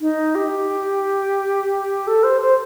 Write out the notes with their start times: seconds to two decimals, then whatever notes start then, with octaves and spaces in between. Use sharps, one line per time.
0.01 D#4
0.35 G4
2.07 A4
2.24 C5
2.41 C5